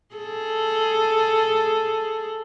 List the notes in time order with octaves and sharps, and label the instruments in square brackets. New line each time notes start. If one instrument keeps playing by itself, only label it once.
[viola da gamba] G#4 A4